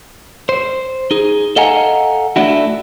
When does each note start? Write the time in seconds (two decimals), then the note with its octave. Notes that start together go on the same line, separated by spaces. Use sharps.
0.49 C5
1.11 D#4 G#4
1.56 A4 D#5 F5 F#5 G#5 A#5
2.36 A3 D4 E4 F#4